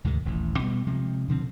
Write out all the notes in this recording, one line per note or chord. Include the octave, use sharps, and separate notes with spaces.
D2 G#2 C3 D#3
D#1 A1 A2
B2 G3 B3
C3 F3 G#3
B2 D3 F3 C4